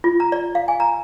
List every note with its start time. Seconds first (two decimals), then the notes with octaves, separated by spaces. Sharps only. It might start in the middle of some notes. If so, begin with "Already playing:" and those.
0.04 F4
0.20 A#5
0.32 D5
0.55 F5
0.68 G#5
0.80 A#5